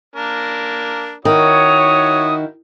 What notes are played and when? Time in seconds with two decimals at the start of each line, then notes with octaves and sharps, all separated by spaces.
0.16 A#3 D4 A#4
1.25 D#3 E4 F#4 C#5 D#6